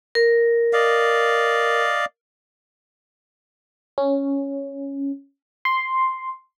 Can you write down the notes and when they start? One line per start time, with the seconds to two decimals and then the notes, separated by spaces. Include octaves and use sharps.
0.15 A#4
0.73 D5 D#5 F5
3.98 C#4
5.65 C6